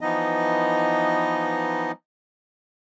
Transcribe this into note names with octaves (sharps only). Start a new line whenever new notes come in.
E3 F3 B3 D#4 D#5